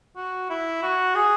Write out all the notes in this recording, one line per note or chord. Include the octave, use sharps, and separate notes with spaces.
F#4
E4
F#4
G#4